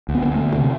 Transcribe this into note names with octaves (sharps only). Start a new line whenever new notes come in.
D2
B3
D2 B3
A3
D3
C3